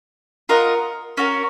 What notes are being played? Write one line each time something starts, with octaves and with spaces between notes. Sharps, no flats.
F4 A#4 D#5 F#5
C#4 F#4 A#4